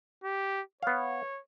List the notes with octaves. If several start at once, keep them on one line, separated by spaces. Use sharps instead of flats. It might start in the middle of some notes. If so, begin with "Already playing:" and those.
G4
B3 C#5 F5